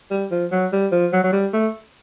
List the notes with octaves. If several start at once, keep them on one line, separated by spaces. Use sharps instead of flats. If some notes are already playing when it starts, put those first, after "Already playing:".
G3
F3
F#3
G3
F3
F#3
F#3
G3
A3